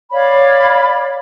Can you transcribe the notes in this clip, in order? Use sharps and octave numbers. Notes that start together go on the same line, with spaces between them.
C#5 D5 F5 B5